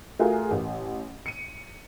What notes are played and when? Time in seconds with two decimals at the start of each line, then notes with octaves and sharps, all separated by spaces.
0.19 A3 F4 F#4 G#4 A#4
0.51 A1
1.26 C#7 D#7